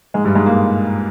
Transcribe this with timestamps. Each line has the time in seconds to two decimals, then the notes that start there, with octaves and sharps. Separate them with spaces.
0.14 G#2 G#3
0.25 G2 G3
0.35 G#2 G#3
0.46 A#2 A#3